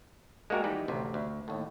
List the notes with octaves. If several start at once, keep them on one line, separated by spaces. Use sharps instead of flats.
G#3 A#3 D4 F#4 G4 A#4
D#3 E3 G3 D#4 B4
A1 D2 C3
D2
D#2 A2